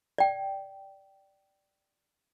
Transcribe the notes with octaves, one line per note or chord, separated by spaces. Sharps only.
D5 G5